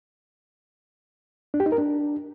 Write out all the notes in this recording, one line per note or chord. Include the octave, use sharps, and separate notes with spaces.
D4
G4
D#4
A#4
D4